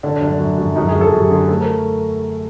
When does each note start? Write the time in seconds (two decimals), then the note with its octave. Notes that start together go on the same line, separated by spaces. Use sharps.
0.03 D3 D4
0.16 D4
0.21 F#2
0.28 D4
0.39 F#2
0.58 F#2
0.76 F#2 D#4
0.89 G#4
0.94 F#2
1.01 A4
1.12 F#2 G4
1.31 D3 G#4
1.48 A3 A4
1.61 A#4